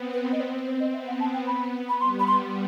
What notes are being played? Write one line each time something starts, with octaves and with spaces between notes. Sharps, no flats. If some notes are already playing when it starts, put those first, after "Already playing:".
Already playing: B3 C4
B4
D#5
C4 C5
C5
C5
D#5
B3 E5
F#5
A5
G5
B5
B5
G3 C6
B5
C6